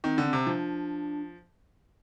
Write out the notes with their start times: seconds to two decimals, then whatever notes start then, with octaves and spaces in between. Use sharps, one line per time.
0.04 D#3 C4
0.18 D3
0.26 C4
0.33 C3
0.46 F3 D4